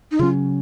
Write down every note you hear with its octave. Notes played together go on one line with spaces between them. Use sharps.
D#4
C#3 F#3 C#4 F4